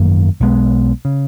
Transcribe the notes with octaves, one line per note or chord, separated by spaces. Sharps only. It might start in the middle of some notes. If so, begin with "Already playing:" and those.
Already playing: G#1 F#2 D#3 A#3
B1 B2 G#3 B3
C#3